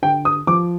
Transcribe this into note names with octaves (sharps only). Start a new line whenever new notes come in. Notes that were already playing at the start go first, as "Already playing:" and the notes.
D3 G5
D#6
F3 D6